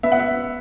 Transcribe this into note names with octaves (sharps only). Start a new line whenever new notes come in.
B3 E5
F#5
E5